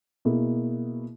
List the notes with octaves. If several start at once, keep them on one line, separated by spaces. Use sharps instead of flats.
B2 A#3 E4 G#4